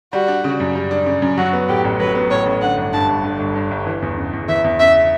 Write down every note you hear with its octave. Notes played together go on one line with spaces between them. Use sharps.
G3 F#4
D4
C#3
F#2
G3
D4
C#3
F#2
F#3 F#4
B3
A2 G4
A1
F#3 B4
B3
A2 C#5
A1
D3 F#5
G1
G2 A5
G1
D3
G1
G2
G1
E3
E2
C#3
E2
E3 E5
E2
C#3 E5